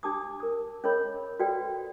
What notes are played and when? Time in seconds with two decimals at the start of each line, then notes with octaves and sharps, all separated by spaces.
0.03 D4 G4 A5 D6 D#6
0.40 A#4 D#6
0.84 C#4 G#4 A#4 C#5 D#5 B5
1.40 F#4 A4 B4 D5 F#5 G5